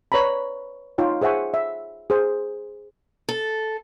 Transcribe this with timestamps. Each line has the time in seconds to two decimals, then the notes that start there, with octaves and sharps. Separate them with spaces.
0.12 B4 C#5 D5 A#5 B5
0.98 D#4 F4 C#5 G5
1.21 G#4 C5 E5 F#5 G#5 C#6
1.54 E5
2.10 G#4 C5
3.29 A4